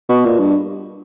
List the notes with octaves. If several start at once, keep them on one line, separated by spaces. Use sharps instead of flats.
B2
A#2
G2